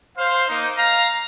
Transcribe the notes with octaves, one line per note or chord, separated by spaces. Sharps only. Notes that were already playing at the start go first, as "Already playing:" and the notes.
C5 F5
A#3 D#4
F5 A#5